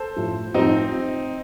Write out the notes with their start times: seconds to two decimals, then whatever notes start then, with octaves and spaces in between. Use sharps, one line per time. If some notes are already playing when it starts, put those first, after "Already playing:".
Already playing: A4 C5
0.16 A2 F3
0.54 A2 F3 C4 D#4